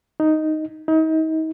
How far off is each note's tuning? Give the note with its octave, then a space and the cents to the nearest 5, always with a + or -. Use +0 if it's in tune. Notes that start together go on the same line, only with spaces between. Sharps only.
D#4 +0
D#4 +35